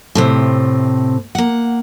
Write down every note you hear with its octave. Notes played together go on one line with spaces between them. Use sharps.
A2 C3 C4
A#3 F#5